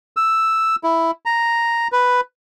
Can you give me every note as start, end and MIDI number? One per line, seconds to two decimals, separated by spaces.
0.17 0.76 88
0.84 1.11 64
1.26 1.88 82
1.92 2.21 71